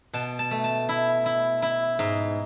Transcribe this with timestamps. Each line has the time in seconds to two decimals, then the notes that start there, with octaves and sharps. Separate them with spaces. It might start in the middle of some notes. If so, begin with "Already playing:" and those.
0.13 B2 A5
0.39 A5
0.51 A3
0.64 A5
0.89 E4
1.26 E4
1.62 E4
1.99 G#2